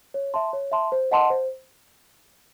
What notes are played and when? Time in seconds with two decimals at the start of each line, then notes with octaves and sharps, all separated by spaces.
0.14 C#5
0.34 E5 A5 C6
0.53 C#5
0.72 E5 A5 C6
0.92 C5
1.11 D#5 F#5 A5 C6
1.30 C5